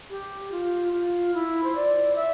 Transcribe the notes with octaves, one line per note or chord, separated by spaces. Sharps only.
G4
F4
F4
E4
C5
D5
E5